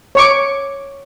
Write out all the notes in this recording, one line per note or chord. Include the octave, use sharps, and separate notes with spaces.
C#5 C#6 D6